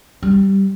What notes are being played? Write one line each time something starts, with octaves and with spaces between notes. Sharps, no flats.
G3